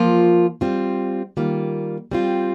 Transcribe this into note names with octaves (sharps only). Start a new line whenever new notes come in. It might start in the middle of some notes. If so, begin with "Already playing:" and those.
Already playing: F3 A#3 F4
G3 C4 F4
D#3 G3 A#3 F4
G3 C4 F4